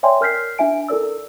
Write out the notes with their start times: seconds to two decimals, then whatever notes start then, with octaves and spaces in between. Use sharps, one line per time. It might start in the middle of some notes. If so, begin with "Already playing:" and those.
0.03 C#5 D5 E5 G5 G#5 C6
0.21 A#4 F6 G6 B6 C7
0.58 D4 E4 E5 G#5 D7
0.88 E4 A4 A#4 D5 E6